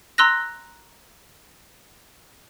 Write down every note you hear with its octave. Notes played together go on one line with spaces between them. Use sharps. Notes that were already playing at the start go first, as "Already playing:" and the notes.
A#5 C6 E6 F#6 A#6